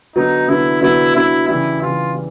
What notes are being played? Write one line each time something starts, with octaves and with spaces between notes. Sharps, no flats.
D3 F#3 B3 D#4
D3 F#3 B3 E4
D3 F#3 B3 E4
D3 F#3 B3 E4
C#3 E3 G3 E4
C#3 E3 G3 F4
G3